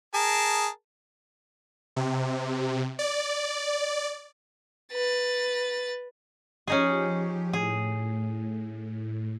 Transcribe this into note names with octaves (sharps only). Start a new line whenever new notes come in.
G#4 A#4 A5
C3
D5
B4 A6
F3 C#4 D#4 G4 G#4
A2 G#4